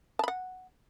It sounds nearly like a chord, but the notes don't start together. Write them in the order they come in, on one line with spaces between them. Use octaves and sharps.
A5 B5 F#5